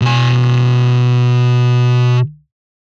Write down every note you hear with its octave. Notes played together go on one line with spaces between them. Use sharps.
B2 G#5